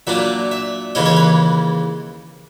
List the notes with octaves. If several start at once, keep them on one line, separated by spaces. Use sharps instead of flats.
A#2 F#3 A#3 D4 E5
E5
D#2 C#3 E3 G#3 C#4 D#5
C#5
B4